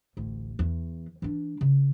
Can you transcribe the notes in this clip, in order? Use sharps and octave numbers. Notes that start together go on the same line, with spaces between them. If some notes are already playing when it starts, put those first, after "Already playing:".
A1 D2
E2
E3 D4
C#3